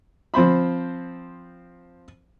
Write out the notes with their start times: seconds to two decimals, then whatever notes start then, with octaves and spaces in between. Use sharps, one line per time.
0.34 F3 C4 C5 B5